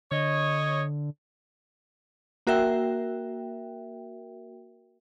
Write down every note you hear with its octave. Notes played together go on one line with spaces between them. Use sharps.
D3 C#5 D#5
A#3 F#4 A#4 E5 G5